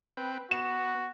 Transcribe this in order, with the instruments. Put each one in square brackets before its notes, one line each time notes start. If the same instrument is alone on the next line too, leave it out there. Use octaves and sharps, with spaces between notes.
[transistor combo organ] C4 B4 G5
[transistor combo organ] B3 [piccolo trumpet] F#4 [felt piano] E7